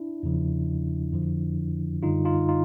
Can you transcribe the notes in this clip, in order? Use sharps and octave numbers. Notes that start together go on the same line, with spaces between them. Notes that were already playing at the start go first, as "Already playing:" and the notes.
Already playing: D4 E4
E2 C#3 F3
F2 D3 F3
F#2 D3 G3 D#4 F4
D#4 F4
D#4 F4